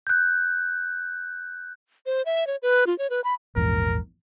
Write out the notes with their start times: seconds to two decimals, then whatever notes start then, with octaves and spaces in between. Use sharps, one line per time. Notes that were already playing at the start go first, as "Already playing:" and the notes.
0.07 F#6 G6
2.06 C5
2.26 E5
2.47 C#5
2.62 B4
2.87 F4
2.98 C#5
3.10 B4
3.24 B5
3.56 A#1 E2 G#2 A#4